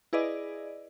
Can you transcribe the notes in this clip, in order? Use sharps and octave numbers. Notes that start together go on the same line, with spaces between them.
E4 G#4 B4 D5 D#5